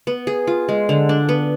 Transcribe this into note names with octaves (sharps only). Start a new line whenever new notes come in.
B3
G#4
F4
G#3
D3
D4
B3